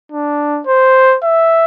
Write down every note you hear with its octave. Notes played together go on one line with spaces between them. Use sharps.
D4
C5
E5